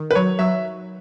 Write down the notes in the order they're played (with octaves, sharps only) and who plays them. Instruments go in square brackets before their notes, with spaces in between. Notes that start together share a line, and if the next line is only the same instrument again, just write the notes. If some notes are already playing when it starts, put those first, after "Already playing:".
Already playing: [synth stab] D#3
[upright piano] B4
[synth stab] F#3 [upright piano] C#5
[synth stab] F#3 [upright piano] E5